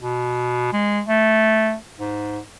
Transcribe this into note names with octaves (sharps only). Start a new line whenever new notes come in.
B2
G#3
A3
G#2